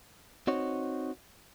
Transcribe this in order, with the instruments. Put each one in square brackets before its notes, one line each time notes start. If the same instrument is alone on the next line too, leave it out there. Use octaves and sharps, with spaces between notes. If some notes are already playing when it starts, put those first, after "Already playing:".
[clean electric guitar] C4 D#4 F#4 C#5